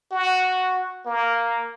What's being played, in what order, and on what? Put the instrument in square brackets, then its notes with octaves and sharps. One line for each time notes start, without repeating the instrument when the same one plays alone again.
[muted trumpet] F#4
A#3